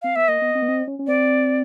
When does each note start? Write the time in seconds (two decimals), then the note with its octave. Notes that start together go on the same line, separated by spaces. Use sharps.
0.02 C4 F5
0.16 B3 E5
0.28 A#3 D#5
0.42 B3
0.55 C4
0.62 B3
0.68 C4
0.87 C#4
0.99 C#4
1.07 C4 D5